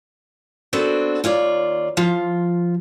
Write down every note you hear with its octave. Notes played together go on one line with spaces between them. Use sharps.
B3 C4 D4 F#4 A4 C5
D#2 F4 C#5 D5
F3 F4